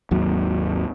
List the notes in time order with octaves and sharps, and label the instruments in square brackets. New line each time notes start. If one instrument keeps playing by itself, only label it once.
[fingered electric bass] G#1 D#2 F#3